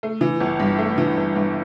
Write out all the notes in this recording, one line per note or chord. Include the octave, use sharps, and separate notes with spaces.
A3
E3
G1
G2
A3
E3
G1
G2